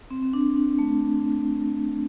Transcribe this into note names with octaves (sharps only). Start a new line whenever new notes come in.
C4
C4
D4
D4
A3